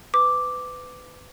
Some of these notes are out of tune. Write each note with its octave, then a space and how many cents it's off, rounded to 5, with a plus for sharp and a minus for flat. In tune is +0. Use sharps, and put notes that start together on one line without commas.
B4 +25 D6 +0